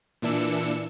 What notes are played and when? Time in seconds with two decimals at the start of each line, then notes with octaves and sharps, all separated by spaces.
0.22 A#2 E3 D4 E6 C#7